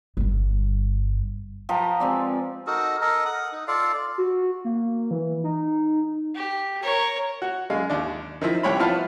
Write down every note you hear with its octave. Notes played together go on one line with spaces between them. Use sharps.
G1 G2
F3 B4 G5 A#5
G#3 C4 D5
D#4 F#4 A4 A#4
A4 A#4 D#5
F#5 D#6
D#4
F4 A4 D5 F5
D5
F#4
A#3
E3
D#4
G4
A#4 C#5
F#4
F#2 G#3 F5
D#2 D4
D#3 F3 E4
C2 G4 C#5 B5
F3 B3 E4 F4 A5 F6